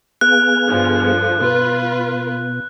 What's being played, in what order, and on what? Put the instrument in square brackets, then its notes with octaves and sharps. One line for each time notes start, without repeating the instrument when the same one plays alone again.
[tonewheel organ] B3 G#4 F5 [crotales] F#6
[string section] G2 D3 F3
[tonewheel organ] B2 [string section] F4 B4